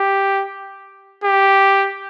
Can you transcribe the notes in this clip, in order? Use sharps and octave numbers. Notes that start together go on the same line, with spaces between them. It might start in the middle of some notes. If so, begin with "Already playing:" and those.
Already playing: G4
G4